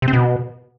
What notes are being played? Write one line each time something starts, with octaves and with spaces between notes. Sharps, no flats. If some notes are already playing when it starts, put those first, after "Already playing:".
C3
C4
B2